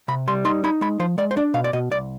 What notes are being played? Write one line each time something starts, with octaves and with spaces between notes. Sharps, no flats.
C3 B5
G3 C6
D#4 C6
D#4 B5
G#3 B5
F3 C5
G#3 D5
C5
D4 D5
B2 F5
D5
B2 D#5
C2 D5